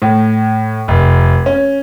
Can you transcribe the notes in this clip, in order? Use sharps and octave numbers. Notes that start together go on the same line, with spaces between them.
A2
F1
C#4